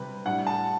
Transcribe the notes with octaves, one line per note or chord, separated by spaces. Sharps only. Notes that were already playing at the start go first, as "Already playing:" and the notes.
Already playing: C3 G3 C4 B4
A2 G3 D4 F#5
A5